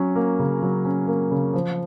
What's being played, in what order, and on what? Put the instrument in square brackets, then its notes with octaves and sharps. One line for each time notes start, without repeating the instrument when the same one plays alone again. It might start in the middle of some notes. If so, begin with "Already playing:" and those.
Already playing: [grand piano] F#3 C#4
A#3
C#3
F#3
C#4
A#3
C#3
F3